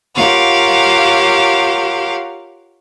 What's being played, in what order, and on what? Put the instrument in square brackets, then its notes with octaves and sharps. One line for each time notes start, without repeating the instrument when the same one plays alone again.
[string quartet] F4 G4 A#4 C#5 F5 F#5